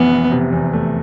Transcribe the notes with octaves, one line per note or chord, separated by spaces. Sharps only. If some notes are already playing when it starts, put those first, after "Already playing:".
Already playing: F1 E3 B3
E3
C3
E2
A3